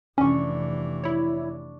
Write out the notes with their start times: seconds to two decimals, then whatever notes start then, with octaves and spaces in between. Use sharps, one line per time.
0.18 F1 E3 C#4 D4 C#6
1.04 E4 C#5